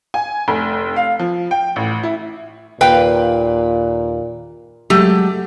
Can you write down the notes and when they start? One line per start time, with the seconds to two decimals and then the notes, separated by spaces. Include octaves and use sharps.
0.14 G#5
0.48 F1
0.96 F5
1.20 F3
1.51 G5
1.76 A1
2.03 E4
2.81 D#2 A#2 B4 F5 G5
4.90 F#3 G#3 A3 G4